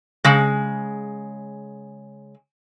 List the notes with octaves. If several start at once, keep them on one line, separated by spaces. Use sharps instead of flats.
C#3 G#3